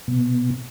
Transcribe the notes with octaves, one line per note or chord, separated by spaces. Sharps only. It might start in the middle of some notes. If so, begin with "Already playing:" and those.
B2